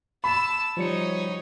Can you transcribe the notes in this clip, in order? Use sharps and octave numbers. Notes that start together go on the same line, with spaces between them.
A5 B5 E6
F3 G3 D#4 C#5 C#7